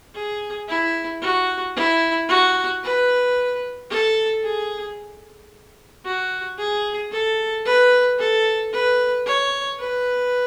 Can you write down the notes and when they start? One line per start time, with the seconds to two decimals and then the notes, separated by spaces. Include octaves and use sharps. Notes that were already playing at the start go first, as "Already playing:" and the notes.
0.14 G#4
0.68 E4
1.22 F#4
1.76 E4
2.29 F#4
2.83 B4
3.90 A4
4.43 G#4
6.05 F#4
6.58 G#4
7.12 A4
7.65 B4
8.19 A4
8.72 B4
9.26 C#5
9.79 B4